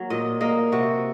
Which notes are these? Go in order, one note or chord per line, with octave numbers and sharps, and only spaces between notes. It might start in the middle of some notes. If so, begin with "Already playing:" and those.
Already playing: F#3 A#3
A#2 D#5
A#3 D#5
C3 F#4